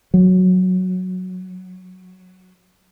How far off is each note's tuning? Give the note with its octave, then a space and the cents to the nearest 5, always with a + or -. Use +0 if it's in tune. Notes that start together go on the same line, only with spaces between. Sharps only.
F#3 -5